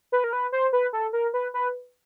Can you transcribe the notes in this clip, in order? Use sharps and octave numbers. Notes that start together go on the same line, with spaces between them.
B4
A#4
B4
C5
B4
A4
A#4
B4
B4